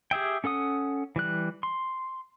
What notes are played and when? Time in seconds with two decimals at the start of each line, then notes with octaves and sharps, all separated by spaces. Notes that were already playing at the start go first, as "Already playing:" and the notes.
0.11 G4 G#4 E5 G5
0.44 C#4 A4 F#5 D#6
1.16 E3 G3 F#6
1.63 C6